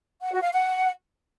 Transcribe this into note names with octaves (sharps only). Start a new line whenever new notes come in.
F#5
F#4
F5
F#5